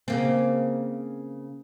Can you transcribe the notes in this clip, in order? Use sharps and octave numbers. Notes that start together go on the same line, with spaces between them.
C#3 A#3 C4